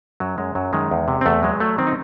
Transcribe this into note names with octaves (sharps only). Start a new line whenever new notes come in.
F#2 F#3
F#2 G#3
F#2 F#3
D#3 G#3
E2
C3
C4
E2 A3
F#3 G#3
F#3 A3
D#3 C4
D#4